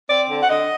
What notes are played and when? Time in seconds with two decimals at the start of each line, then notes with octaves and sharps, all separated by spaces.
0.08 C4 D5
0.30 D3
0.43 F#5
0.49 D3 D#5